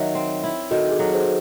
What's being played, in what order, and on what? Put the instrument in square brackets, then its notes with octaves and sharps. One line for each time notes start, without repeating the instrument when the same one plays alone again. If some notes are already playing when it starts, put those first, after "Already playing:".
Already playing: [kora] D#3 F#3 [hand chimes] C#5 E5
[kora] C4
E4
[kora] D#3 [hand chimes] F#4 A4
[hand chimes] G#4
[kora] F#3 [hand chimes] F#4 A4
[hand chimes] G#4 C5